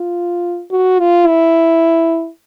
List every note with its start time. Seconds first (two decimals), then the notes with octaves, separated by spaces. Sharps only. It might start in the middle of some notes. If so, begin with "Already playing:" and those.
Already playing: F4
0.71 F#4
1.00 F4
1.27 E4